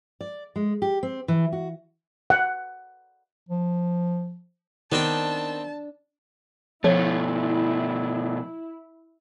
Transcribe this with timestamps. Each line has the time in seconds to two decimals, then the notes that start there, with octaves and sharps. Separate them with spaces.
0.21 D5
0.56 G#3
0.82 G4
1.03 C4
1.28 E3
1.52 F#4
2.30 F#5
3.49 F3
4.92 D#3 B3 C4 D4 G5 A5
6.84 B2 F3 A3 E4 C#5